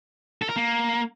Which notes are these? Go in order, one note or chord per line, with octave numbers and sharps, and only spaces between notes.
A4
A#4
A#3